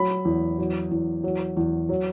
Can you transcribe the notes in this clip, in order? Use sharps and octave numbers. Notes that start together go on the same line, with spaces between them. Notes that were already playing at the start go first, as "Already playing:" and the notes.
Already playing: F#3 B5
E2
F#3
E2
F#3
E2
F#3